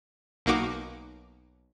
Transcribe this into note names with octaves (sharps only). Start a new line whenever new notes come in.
B1 A#3 D#4 F#4 D6